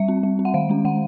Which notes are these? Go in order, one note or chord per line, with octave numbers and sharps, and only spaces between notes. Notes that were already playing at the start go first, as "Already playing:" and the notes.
Already playing: G3 E5
C4
G3
C4
F#5
D#3 F5
G#3 C#4
D#3 F#5